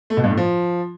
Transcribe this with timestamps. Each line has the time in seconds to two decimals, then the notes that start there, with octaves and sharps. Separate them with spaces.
0.10 A3
0.17 B2
0.24 G2
0.31 A2
0.37 F3